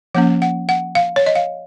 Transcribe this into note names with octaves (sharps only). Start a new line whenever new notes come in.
F3 A#3 C#4 F#5
F#5
F#5
F5
C#5
D#5
F5